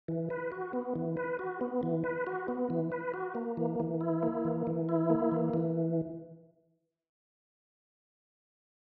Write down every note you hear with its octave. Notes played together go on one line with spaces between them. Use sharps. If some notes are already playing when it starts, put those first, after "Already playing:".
E3
B4
F#4
B3
E3
B4
F#4
B3
E3
B4
F#4
B3
E3
B4
F#4
A#3
E3
E3
E4
A#3
E3
E3
E4
A#3
E3
E3